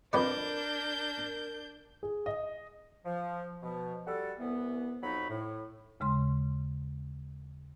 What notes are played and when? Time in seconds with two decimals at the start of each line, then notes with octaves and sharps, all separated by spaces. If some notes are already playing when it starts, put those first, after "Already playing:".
0.13 F2 D4 A#4 B4 D5 G6
2.03 G#4
2.26 D#5
3.06 F3
3.63 B2 F3
4.07 G3 F#4 A4
4.39 C2 E3 B3
5.03 F2 F#3 D#4 F#4 B5
5.30 A2
6.00 D#2 C#3 G#3 C6